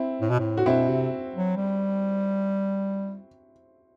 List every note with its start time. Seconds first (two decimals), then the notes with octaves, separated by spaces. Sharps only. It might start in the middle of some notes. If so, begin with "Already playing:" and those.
Already playing: C4 E4
0.21 A2
0.30 B2
0.39 A2
0.57 F#4
0.66 B2 C4 E4
0.88 C3
1.35 F#3
1.56 G3